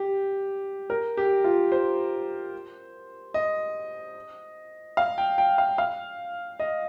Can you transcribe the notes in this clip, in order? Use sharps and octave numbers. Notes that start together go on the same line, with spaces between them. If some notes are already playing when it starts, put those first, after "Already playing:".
Already playing: G4
A#4
G4
F4
C5
D#5
F5
G5
G5
F5
F5
D#5